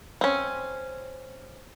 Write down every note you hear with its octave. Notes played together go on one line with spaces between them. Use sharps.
C4 C#4